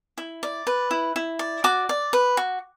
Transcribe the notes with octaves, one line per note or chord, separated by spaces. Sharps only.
E4
D5
B4
E4
E4
D5
F#4 D6
D5
B4
F#4